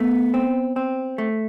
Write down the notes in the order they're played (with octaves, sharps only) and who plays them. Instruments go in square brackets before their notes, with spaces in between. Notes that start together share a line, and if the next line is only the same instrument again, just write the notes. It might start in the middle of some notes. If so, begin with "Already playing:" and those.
Already playing: [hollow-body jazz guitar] A3 [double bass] B3
[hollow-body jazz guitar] C4
C4
A3